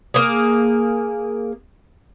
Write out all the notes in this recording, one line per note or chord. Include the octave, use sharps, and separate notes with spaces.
A#3 G#4